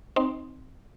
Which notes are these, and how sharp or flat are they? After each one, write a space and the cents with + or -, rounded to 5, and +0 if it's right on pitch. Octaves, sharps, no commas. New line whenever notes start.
C4 +0 D#4 +0 C6 +0